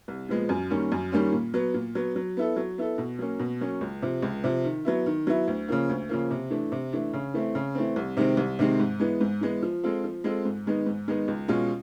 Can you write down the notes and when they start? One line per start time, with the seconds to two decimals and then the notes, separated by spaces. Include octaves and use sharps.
0.08 C2
0.29 A#2 F3 G#3 B3
0.49 F#2
0.70 D#3 G3 A#3 C#4
0.92 F#2
1.12 D#3 G3 A#3 C#4
1.32 A#2
1.54 F#3 B3
1.74 A#2
1.95 F#3 B3
2.16 F#3
2.37 B3 E4 A4
2.56 F#3
2.78 B3 E4 A4
2.98 B2
3.19 F#3 A#3 C#4
3.39 B2
3.61 F#3 A#3 C#4
3.81 C#2
4.02 C3 F3
4.22 C#2
4.44 C3 F3
4.64 D#3
4.85 F#3 B3 E4
5.06 D#3
5.27 F#3 B3 E4
5.48 D2
5.68 C#3 F3 A#3
5.90 D2
6.09 C#3 F3 A#3
6.31 C3
6.51 E3 A3 D4
6.72 C3
6.93 E3 A3 D4
7.13 C#3
7.34 E3 A3 C4
7.55 C#3
7.75 E3 A3 C4
7.96 C2
8.17 C3 D#3 G#3 C4
8.37 C2
8.59 C3 D#3 G#3 C4
8.80 G#2
9.00 E3 G#3 B3
9.21 G#2
9.41 E3 G#3 B3
9.62 F3
9.83 G#3 C4 F4 A4
10.04 F3
10.24 G#3 C4 F4 A4
10.45 G#2
10.66 D#3 G#3 B3 D#4
10.86 G#2
11.08 D#3 G#3 B3 D#4
11.28 C#2
11.48 B2 G#3 C#4 F4